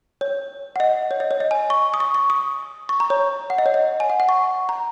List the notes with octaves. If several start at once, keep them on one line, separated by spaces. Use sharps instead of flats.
C#5
F#5
D#5
C#5
D#5
C#5
D#5
G#5
C#6
D#6
C#6
C#6
D#6
C#6
A#5
C#5
F#5
D#5
C#5
D#5
G#5
F#5
F#5
C#6
A#5